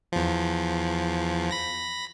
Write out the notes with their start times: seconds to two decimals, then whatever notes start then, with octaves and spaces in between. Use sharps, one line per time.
0.12 E2 F3
1.51 B5 A#6